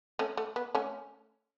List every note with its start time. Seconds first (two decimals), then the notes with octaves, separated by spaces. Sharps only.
0.19 A3 C#4
0.37 A3
0.56 B3
0.75 A3 C#4